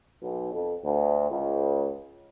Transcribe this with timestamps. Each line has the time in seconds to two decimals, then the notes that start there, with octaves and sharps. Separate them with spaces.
0.21 B1
0.53 F2
0.84 D2
1.31 C#2